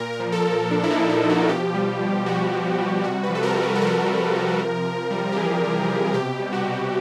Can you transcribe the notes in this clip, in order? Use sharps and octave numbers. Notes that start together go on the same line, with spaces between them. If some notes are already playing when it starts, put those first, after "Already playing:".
Already playing: A#2 A#4
A#4
F3
A4
A#2
F3 D4
E4
D#4
A#2
E4
F3
F#4
B2 G4
G3
B2
G3 F#4
B2
G3
C3 F#4
B4
F3
A4
A#4
C3
B4
A4
F3 A#4
C3
F3
C3
C3
G3
G4
E3 G#4
C3
C3
B2 G4
G3
F#4
B2